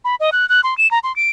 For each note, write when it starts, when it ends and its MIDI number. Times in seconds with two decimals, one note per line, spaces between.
0.04 0.15 83
0.20 0.30 75
0.32 0.48 90
0.49 0.61 90
0.64 0.77 84
0.78 0.89 100
0.91 0.99 82
1.03 1.14 84
1.16 1.30 98